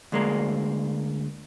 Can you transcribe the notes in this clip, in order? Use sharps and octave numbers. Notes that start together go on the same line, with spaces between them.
D2 G#3 A#3